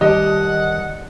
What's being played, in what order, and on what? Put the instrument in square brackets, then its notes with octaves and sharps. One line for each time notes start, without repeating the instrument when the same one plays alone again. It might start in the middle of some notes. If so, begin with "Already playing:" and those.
[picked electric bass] D#3 G3 [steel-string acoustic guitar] G4 D5 A5 [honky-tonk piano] D#5 [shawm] F#5